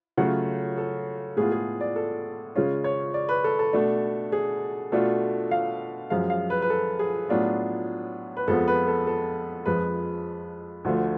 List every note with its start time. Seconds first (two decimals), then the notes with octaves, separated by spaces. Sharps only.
0.17 C#3 F#3 A3 F4 F#5
0.78 A4
1.37 A2 G#3 B3 F4 G#4
1.52 G#4
1.81 D5
1.96 A4
2.56 C#3 G#3 C#4 F4
2.84 C#5
3.14 D5
3.29 B4
3.44 A4
3.59 A4
3.73 B2 A3 D4
4.32 G#4
4.92 B2 A3 D4 F4 A4
5.51 F5
6.10 F#2 F3 G#3 F5
6.30 F5
6.50 B4
6.62 B4
6.70 A4
6.99 G#4
7.29 A2 F#3 B3 D4 F4
8.37 B4
8.48 F2 F3 G#3 B3 A4
8.68 B4
8.87 A4
9.07 A4
9.66 F2 F3 G#3 B4
10.85 D2 D3 F3 A3 F4